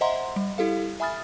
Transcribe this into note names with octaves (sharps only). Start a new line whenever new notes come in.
C5 D#5 E5 F#5 A#5 C6
G3
E4 G4 A4 F5
E5 G#5 B5 D#6 F6 A6